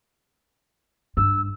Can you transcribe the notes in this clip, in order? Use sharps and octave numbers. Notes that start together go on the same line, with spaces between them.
G2 E6